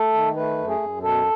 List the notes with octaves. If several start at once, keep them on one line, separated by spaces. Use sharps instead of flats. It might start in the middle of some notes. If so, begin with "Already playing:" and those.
Already playing: A3 A4
D#3
A3 B4
F#2
G#4
F#2
B2 A4